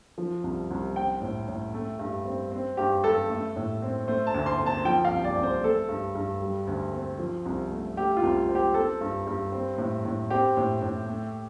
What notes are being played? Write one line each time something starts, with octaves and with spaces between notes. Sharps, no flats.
F3
C2
C2
C4 G5
A2
A2
A3
G2
C4
C4
G2 G4
G2 A4
A3
A2
C4
A3 C5
A5
D2
C6
C4
A5
F3 G5
F5
C2
D5
C2
C5
A3 A4
G2
G2
G3
D2
C4
F3
C2
A3
A3 G4
F4
C2
C4
G4
C4 A4
G2
G2
C4
A2
A2
C4 G4
A2
A2
A3